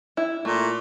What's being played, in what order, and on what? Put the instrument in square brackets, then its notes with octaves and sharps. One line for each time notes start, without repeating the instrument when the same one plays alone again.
[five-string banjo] E4
[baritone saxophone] A#2 [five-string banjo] A3